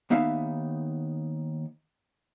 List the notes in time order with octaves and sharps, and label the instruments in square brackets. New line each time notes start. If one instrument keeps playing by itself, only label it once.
[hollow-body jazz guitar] D#2 B3 D#4 E5 F5